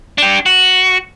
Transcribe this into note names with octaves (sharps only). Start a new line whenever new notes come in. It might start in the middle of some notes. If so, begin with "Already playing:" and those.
D4 G4
F#4